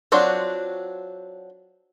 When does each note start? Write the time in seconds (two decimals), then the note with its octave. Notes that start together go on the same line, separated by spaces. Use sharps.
0.12 F#3 C4 D4 F4 F#4